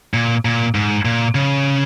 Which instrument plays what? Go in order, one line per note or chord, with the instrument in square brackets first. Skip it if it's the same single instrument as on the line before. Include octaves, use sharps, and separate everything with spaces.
[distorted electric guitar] A#2
A#2
G#2
A#2
C#3